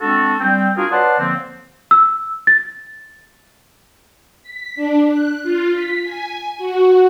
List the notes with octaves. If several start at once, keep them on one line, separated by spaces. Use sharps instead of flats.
G#3 C4 D4 F#4 A4
G3 C4 G5
D4 F4 F#4 G#4 A#4 F5
B4 C#5 D5 F#5 A5 C6
D3 F3 A#3 C4
E6
A6
B6
D4
F#6
F4
B6
G#5
F#4